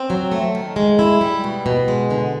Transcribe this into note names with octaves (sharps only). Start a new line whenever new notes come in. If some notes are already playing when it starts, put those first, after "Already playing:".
Already playing: C4
F#3
A3
D#3
G#3
E4
G3
B2
B2
G#3
D3